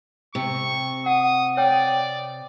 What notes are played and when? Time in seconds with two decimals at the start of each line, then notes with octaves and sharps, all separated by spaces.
0.35 C3 C#6
1.06 F#5 D#6
1.57 C#5 D5 G5